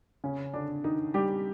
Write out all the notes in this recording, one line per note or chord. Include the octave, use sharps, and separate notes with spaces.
C#3 C#4
D3 D4
D#3 D#4
G3 G4